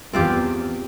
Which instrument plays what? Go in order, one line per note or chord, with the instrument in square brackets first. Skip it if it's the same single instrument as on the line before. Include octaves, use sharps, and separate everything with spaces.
[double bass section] E2 [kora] C4 F4 G4